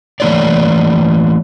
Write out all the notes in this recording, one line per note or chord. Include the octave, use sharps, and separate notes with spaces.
E3 A3 A#3 F4 C#5 D5